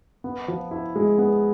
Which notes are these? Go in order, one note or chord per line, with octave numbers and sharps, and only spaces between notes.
B3
F3
E4
G#3
B3